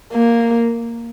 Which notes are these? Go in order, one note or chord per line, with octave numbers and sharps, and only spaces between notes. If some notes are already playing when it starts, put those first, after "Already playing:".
A#3